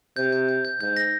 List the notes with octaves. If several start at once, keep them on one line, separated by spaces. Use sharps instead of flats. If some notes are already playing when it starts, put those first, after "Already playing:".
C3 G6
G6
G6
G6
G#2 G6
A#6